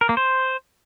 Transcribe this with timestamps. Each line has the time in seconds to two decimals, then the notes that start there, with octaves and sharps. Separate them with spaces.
0.01 A#4
0.09 A#3
0.17 C5